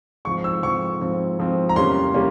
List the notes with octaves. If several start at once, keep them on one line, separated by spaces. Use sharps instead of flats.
G#2 F3 C4 C#6
E6
G#2 F3 C4 C#6
G#2 F3 C4
G#2 F3 C4
A#5
E2 C3 G3 A#3 C#4 C6
C3 G3 A#3 C#4